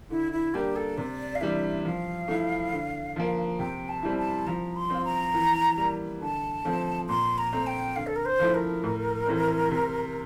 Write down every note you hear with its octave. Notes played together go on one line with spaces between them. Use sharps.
D3 E4
E4
G3 A#3 D4 G4
A4
C3 D5
F5
E3 G3 D4 E5
F3 F5
A3 E4
D3
F3 A#3
C3 G5
A5
G3 C4 E4
A5
F3 A#5
C6
C4 F4
A#5
E3
G3 A#3
D3 A5
F3 A3 C4
A#2 C6
A#5
A3 C4
G5
D3 F5
A4
A#4
C5
F3 A3 E4
A#4
A2
E3 A3 C4
C3